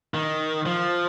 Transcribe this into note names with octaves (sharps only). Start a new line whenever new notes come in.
D#3
F3